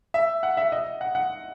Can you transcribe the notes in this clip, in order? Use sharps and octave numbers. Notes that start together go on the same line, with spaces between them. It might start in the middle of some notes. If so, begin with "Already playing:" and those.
E5
F#5
E5
D#5
F#5
F#5